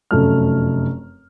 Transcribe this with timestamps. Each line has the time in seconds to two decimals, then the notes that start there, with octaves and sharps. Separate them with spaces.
0.11 F1 F#2 A3 F6